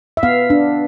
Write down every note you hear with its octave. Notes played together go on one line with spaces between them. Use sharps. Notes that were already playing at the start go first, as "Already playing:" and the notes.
E5
B3 F5
D4